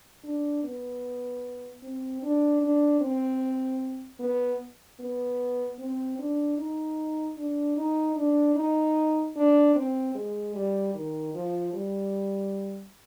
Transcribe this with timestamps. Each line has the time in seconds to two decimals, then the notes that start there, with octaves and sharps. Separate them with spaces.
0.24 D4
0.64 B3
1.82 C4
2.23 D4
2.61 D4
3.01 C4
4.20 B3
5.00 B3
5.79 C4
6.19 D4
6.58 D#4
7.37 D4
7.77 D#4
8.16 D4
8.56 D#4
9.36 D4
9.75 C4
10.15 G#3
10.55 G3
10.95 D#3
11.34 F3
11.73 G3